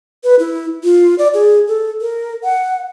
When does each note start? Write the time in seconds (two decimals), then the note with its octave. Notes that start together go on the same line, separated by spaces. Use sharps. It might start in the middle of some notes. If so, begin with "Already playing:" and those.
0.24 B4
0.39 E4
0.83 F4
1.18 D5
1.34 G#4
1.68 A4
2.01 A#4
2.44 F#5